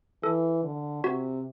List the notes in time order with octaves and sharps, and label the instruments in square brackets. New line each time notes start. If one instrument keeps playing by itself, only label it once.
[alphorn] E3 [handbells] A4
[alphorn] D3
[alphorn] C3 [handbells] F#4